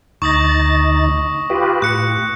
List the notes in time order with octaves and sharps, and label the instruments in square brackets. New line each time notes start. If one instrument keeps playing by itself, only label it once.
[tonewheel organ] D2 D#4 A6 [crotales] C#6 D#6 A#6
[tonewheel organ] F4 G4 B4
[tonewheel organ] A2 [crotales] F#6 C#7